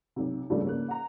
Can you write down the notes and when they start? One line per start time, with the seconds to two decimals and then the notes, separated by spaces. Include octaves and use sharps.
0.16 B1 C3
0.50 C#2 G2 C#3 F3 G3 A3
0.65 C#3 A#3 F#6
0.88 F#5 A#5